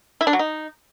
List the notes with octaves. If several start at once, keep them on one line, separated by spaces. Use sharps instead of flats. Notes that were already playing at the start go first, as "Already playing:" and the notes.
E4
D4
F#3
D#4